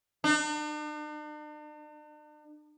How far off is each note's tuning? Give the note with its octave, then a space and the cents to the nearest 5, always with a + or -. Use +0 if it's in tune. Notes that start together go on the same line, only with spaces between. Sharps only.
D4 +45